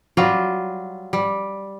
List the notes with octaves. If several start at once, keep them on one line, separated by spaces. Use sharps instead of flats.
F#3 G3 F4
G3